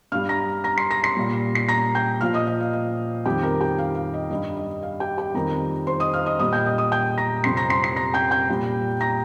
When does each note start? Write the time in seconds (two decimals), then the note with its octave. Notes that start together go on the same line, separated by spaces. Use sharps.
0.12 G2 G3 F5 F6
0.29 A#5 A#6
0.64 A#5 A#6
0.78 C6 C7
0.90 A#5 A#6
1.03 C6 C7
1.17 A#2 G3
1.55 C7
1.69 A#5 A#6
1.95 G5 G6
2.21 A#2 F3 F5 F6
2.34 D#5 D#6
2.47 D#5
2.60 F5
2.73 F5
3.26 F2 D#3 G3 G4 G5
3.43 A#4 A#5
3.61 G4 G5
3.78 F5
3.95 F5
4.14 D#5
4.31 G2 G3 D#5
4.57 D#5
4.83 F5
5.00 G4 G5
5.17 G4 G5
5.34 F2 D#3 G3 A#4 A#5
5.87 C5 C6
6.00 D#5 D#6
6.13 F5 F6
6.26 D#5 D#6
6.39 A#2 G3 D#5 D#6
6.53 G5 G6
6.66 D#5 D#6
6.78 D#5 D#6
6.92 G5 G6
7.18 A#5 A#6
7.44 F2 C3 G3 C6 C7
7.57 A#5 A#6
7.70 C6 C7
7.83 C6 C7
7.96 A#5 A#6
8.14 G5 G6
8.31 G5 G6
8.49 A#2 G3
9.00 A#5 A#6